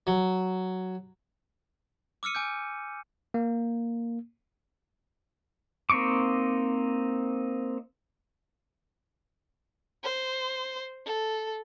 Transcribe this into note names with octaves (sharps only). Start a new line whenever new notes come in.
F#3
D6 E6 F6 C#7 D#7
G#5 D6 G6
A#3
A#3 C4 D#4 C#6 D6
C5
A4